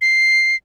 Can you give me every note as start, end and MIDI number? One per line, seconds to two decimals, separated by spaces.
0.01 0.56 96